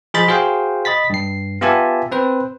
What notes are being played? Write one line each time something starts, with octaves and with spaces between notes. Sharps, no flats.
F3 G#4 C5 D#5 B5 A6
F#4 G#4 C5 F5 G5
D#5 B5 A6 B6
G2 C7
B3 F4 G4 E5 G#5 A5
C4 B4 C5